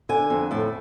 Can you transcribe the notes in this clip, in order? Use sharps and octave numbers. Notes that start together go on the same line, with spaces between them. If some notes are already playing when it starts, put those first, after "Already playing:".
D3 G#5
F2
A2 A5